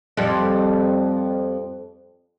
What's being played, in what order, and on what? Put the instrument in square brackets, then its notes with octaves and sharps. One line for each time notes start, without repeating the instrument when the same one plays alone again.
[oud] F2 G3